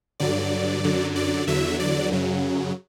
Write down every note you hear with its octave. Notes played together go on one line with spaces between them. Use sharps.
G2 D3 F#3 D5
F#2 D3 F#3
D5
E2 D3 F#3 E5
D5
F#2 C#3 F#3